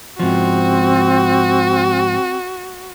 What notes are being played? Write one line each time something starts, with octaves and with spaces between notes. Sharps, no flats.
G#2 F3 C4 F#4